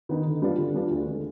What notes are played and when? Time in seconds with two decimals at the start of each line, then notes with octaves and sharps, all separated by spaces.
0.09 D#3 B3 D#4
0.26 D3
0.42 G3 B3 D4 F4
0.58 D3
0.74 G3 B3 D4 F4
0.91 D2
1.07 D3 G#3